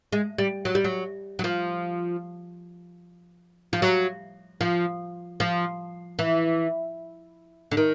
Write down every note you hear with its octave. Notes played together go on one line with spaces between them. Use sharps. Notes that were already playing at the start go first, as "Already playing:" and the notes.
G#3
G3
F#3
G3
F#3
F#3
F3
F3
F#3
F3
F3
E3
D3
D#3